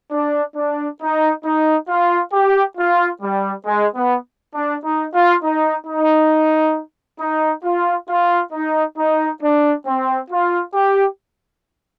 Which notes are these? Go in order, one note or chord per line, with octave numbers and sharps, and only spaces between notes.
D4
D4
D#4
D#4
F4
G4
F4
G3
G#3
B3
D4
D#4
F4
D#4
D#4
D#4
F4
F4
D#4
D#4
D4
C4
F4
G4